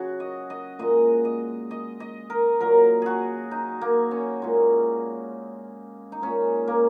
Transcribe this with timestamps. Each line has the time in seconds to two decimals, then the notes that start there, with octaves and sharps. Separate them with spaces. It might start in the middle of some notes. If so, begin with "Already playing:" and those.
Already playing: C#3 F#3 F#4 G#4
0.20 D#5
0.50 D#5
0.79 A#2 G#3 D#5
1.25 D#5
1.71 D#5
2.00 D#5
2.30 A#4
2.61 A#2 F#3 A#4
3.02 F#4 G#4
3.51 D#4
3.81 A#3
4.11 C#4
4.42 A#2 G#3
6.12 D#4
6.22 A#2 G#3 C#4
6.68 A#3